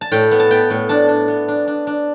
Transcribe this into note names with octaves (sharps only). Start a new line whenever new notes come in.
A5
A2 G5
B3
A5
B3 G5
A2
D4 A5
D4
B3
D4
D4
D4